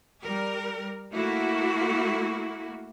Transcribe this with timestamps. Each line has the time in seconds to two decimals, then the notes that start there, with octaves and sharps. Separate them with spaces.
0.21 G3 A#4
1.13 A3 A#3 E4 F#4